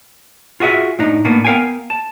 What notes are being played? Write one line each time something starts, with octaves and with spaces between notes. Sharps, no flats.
F4 F#4 G#4 E5
A2 D4 D#4
A2 A#3 B3 D4
B3 A#4 F5 G5 G#5
A5